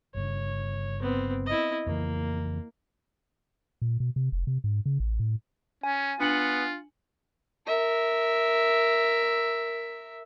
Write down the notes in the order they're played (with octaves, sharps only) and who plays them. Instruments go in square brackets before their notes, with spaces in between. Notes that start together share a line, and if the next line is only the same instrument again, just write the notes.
[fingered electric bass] G1 G2 C#3 [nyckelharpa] C#5
[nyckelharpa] B3 C4
E4 D#5
[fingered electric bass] F2 C#3 E3 [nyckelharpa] A#3
[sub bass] A#2
B2
C3
F1
C3
G#2
C#3
A1
A2
[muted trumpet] C#4 [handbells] G#5
[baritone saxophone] B3 [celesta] D4 C#7 F#7 [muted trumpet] F4
[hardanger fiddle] A#4 E5